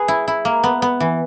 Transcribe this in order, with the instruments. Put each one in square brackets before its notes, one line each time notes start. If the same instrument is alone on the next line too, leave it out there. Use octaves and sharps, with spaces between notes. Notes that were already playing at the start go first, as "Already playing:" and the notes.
Already playing: [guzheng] G#4 B4
E4
E4
A#3
B3
B3
E3